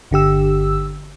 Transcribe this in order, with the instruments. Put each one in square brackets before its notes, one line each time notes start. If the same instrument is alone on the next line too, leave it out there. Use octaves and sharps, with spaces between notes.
[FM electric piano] G1 D3 G4 E6